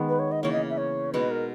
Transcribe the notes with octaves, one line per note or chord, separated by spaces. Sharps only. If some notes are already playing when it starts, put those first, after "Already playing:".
Already playing: D#3 G#3 B3
B4
C#5
D#5
C#3 E3 A#3 C#5
D#5
E5
C#5
B2 G#3 D#4 B4
A#4